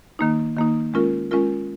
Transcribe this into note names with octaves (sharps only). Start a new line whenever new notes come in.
D#3 A#3 D#4
D#3 A#3 D#4
G#3 C#4 F4 A#4
G#3 C#4 F4 A#4